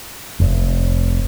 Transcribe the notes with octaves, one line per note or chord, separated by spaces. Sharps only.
F1